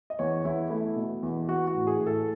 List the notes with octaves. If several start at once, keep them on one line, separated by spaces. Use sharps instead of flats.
D#5
E2 C#5
E2 E4
A3 E4
B2
E2
E3 F#4
F#4
A2
G#4
A2
A4